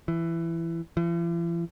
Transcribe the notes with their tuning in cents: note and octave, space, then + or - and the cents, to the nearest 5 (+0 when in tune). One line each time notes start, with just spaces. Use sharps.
E3 +15
E3 +45